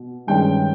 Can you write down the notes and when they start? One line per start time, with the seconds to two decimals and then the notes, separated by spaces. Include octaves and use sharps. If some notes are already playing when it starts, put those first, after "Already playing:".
Already playing: B2
0.27 G2 D#3 G#3 C#4 G5